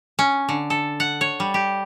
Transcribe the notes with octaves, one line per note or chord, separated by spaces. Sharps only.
C#4
D3
A4
F#5
C#5
G3
G4